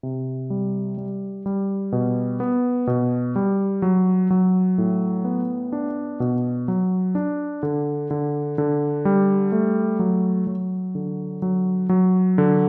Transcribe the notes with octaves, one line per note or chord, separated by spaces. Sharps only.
C3
G3
G3
G3
B2
B3
B2
G3
F#3
F#3
A2
B3
D4
B2
F#3
D4
D3
D3
D3
G3
A3
F#3
F#3
D3
F#3
F#3
D3